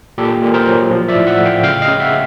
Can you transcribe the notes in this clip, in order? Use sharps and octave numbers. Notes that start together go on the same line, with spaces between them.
A#2 G4 A4
A#2
A#4 C5
F#3
F3
D5 E5
A2
E5 F#5
A3
F5 G5
C#3 F5 G5
D#5 F5
C#3
E5 F#5